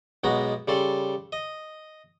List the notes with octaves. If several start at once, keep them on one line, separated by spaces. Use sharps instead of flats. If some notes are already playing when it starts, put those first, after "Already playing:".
B1 F#3 G#3 B3 A#5
C#3 G3 A4 C6
D#5